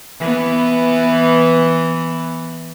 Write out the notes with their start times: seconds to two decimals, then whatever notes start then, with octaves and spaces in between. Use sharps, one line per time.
0.20 E3 B3